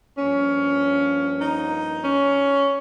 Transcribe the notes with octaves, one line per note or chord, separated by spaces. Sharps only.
G2 F3 A#3 C#4
D#4
C#4